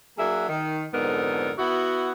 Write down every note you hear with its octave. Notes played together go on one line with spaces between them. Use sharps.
F#3 A#3 D4 G#4 E5
D#3
F2 G#2 D3 B3 A#4
B3 E4 F#4